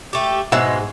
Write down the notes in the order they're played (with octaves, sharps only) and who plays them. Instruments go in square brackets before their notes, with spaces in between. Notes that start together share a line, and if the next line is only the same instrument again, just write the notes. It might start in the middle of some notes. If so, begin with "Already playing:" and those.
[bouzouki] A3 G4
[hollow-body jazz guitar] G#2 E5 F#5 [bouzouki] B2 G#3